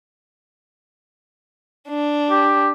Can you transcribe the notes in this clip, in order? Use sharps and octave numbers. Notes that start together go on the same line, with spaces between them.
D4
G4